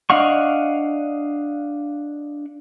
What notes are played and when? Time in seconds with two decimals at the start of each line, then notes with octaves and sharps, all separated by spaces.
0.10 D4 D#5 F5 F#5 C#6